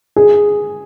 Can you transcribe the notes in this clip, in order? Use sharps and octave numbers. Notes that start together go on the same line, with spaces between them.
G#4